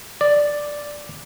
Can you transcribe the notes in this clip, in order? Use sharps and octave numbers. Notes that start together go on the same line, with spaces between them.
D5